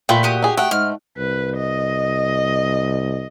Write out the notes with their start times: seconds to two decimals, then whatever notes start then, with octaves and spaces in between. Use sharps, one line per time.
0.09 A#2 A3 F4 B4 G5
0.23 F#4 G4 D#6
0.42 D#4 G#4
0.57 A3 F#5 G5
0.71 G#2 F6
1.18 C2 B4
1.57 D#5